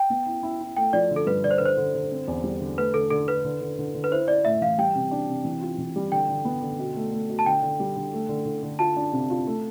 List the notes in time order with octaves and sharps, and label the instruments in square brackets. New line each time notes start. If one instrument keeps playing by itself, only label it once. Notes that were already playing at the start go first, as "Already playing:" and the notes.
Already playing: [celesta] G5
[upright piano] B3
E4
E4
E4
[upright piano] A3 [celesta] G5
[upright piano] F3 [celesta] D5
[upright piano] D3
[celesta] A4
[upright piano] G2 [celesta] B4
[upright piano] D3 [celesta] D5
[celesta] C5
[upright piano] D3 [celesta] B4
[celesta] C5
[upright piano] D3
D3
C4
E2
G3
D3
[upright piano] A3 [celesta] B4
[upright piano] D3 [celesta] A4
[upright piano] D3 [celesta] A4
[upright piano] D3 [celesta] B4
[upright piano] D3
D3
D3
D3
[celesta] B4
[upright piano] E4 [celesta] C5
[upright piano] E4 [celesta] D5
[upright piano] A2 [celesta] E5
[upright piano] E3 [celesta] F5
[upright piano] G3 [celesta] G5
[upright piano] C3
D4
C3
E3
F4
E3
G3
[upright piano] D3 [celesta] G5
[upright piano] D3
B3
D3
B2
A3
A3
B2
[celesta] A5
[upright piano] D3 [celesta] G5
[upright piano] D3
G3
D3
A3
D3
D3
D3
[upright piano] F4 [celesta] A5
[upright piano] D4
C3
F4
A3